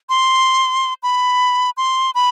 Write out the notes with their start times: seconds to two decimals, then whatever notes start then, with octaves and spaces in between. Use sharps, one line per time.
0.09 C6
1.03 B5
1.77 C6
2.15 B5